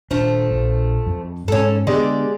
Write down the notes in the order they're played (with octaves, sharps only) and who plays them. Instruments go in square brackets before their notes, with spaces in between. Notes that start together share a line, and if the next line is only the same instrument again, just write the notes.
[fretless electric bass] D#1 D4 [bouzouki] F3 A3
[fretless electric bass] A#1
F2
[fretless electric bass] G#2 [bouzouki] C#4 A4
[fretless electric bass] D3 B3 [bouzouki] G#3 G4 D5